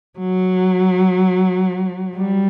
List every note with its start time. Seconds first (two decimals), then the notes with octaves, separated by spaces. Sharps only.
0.19 F#3
2.16 G3